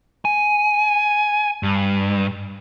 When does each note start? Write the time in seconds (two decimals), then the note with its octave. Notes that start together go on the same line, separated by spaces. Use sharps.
0.25 G#5
1.63 G2